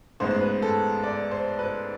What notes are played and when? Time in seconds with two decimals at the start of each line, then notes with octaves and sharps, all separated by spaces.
0.20 A1 G#2 G#3 B3 C5
0.31 C5
0.41 B4
0.62 A4
1.04 D5
1.31 C5
1.59 B4